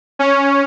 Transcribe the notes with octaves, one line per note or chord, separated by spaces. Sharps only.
C#4